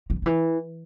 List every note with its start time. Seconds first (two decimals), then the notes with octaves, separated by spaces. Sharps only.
0.10 F3
0.22 D#3
0.26 E3